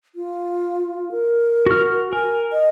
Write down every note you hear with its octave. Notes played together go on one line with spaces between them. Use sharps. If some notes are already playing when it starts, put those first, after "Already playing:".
F4
A#4
F#4 F6
A#4 G#5
D#5